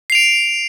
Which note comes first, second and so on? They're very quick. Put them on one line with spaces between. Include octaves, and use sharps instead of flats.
C7 F7 D7